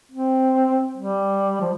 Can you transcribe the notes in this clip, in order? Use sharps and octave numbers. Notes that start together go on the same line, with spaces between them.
C4
G3
F3